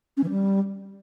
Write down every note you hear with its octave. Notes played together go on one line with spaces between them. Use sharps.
C#4
E3
G3